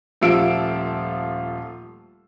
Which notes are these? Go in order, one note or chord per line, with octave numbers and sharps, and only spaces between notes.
D#1 F3 A3 F4 E6 D7